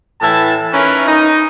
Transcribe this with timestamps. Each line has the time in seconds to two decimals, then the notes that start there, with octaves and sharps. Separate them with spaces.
0.21 A2 E3 E5 A5
0.72 C#4 D#4 E4 A#4 B4 C#5
1.06 D#4